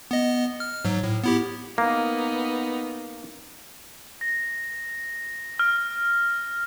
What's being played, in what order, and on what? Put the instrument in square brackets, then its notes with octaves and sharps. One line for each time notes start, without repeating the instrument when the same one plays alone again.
[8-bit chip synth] B3 D#5
F6
G#2 F#3
A2
B3 E4 G4
[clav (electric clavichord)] A#3 [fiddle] B3 D#4
[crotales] A#6
F6